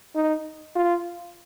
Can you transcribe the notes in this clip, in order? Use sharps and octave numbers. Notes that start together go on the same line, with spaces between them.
D#4
F4